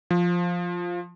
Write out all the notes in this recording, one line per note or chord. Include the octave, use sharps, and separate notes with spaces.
F3